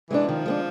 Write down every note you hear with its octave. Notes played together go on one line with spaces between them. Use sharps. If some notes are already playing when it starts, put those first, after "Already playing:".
E3 G#3 B3 D4
D#3 F3
G#3 B3 D4